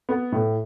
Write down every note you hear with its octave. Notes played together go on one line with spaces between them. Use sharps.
B3
A2